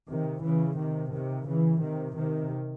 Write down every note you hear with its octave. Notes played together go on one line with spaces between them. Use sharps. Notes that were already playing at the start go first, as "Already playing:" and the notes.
C3 D#3
C#3 E3
C3 D#3
C3 D#3
C#3 E3
C3 D#3
C3 D#3